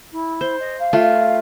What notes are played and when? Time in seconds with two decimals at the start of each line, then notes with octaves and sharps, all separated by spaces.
0.12 E4
0.41 C5
0.60 D#5
0.79 F5
0.93 A3 F4